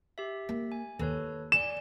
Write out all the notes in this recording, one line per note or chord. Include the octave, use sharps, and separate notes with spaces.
G4 E5
A#3
G#5
D#2 A4 B4 C#5
D5 G#5 E7